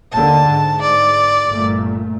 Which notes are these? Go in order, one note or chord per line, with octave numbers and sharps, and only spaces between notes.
D#2 D3 A5
G#2
D5
G1 A#2 A3